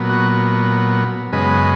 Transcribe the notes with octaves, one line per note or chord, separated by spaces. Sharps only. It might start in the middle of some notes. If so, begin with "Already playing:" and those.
Already playing: A#2 F#3 B3
F#4
F#2 C#3 G#3 B3 B4 D#5